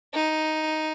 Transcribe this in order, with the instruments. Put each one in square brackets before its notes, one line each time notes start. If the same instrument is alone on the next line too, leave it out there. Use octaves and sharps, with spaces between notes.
[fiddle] D#4